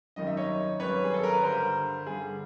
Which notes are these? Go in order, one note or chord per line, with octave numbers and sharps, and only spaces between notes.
G#1 F#2 D#3 G3 D#5
E5
C#5 D#5
G#1 F#2 D#3 G3 B4 C#5
G#4
A4
A#4
B4
G2 D3 G3 A#4 C5
G2 D3 G3 G#4